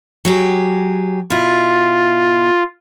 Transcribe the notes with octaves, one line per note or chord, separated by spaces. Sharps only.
F#3 G4 G#4
B2 E4 F4